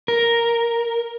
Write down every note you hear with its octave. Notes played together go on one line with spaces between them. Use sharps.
A#4